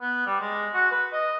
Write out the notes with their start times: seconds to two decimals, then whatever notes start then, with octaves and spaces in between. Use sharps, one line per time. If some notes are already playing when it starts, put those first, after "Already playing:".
0.01 B3
0.26 G3
0.40 G#3
0.74 F#4
0.92 B4
1.12 D#5